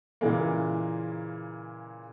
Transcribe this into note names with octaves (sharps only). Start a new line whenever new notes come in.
A#2 C#3 E3 G#3 A#3